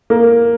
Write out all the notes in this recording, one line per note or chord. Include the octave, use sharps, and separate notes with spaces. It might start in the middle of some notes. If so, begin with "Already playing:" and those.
A#3